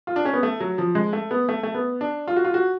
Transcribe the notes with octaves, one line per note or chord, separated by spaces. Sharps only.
F4
D4
C#4
B3
A3
F#3
F3
G#3
A3
B3
A3
A3
B3
D4
F4
F#4
F4
F#4